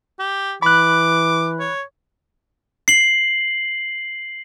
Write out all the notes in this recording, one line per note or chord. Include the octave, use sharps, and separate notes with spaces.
G4
E3 B5 D6 F#6
C#5
C7 F#7